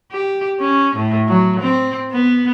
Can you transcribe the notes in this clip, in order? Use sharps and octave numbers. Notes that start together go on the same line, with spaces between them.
G4
C#4
A2
F#3
C4
B3